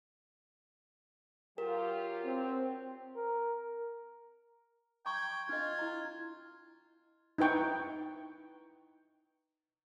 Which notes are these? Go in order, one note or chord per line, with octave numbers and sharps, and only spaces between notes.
F#3 F4 G4 A#4
C4
A#4
G5 A#5 C6 C#6 G#6
D4 F4 D#5
E4 A#5
D#4 E4 B4 G5 C#6